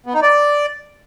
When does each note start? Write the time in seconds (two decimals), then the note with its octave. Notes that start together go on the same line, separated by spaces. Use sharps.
0.06 B3
0.14 D#4
0.22 D5